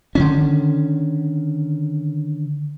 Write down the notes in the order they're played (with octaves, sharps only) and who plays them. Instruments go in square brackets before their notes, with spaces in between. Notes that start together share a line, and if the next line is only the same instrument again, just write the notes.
[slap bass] D3 D#3 C#4